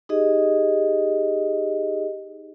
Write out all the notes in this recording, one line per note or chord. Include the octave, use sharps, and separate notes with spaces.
D#4 G4 G#4 D#5